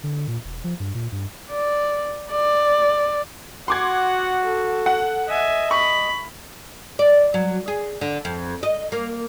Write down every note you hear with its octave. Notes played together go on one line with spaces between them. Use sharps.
D3
A#2
E1
F3
G2
A#2
G2
D5
D5
F#4 F#5 C6 D6 G#6
A4
F#5
D#5 E5 G#5
B5 C#6
D5
F#3
G#4
D3
F2
D#5
A#3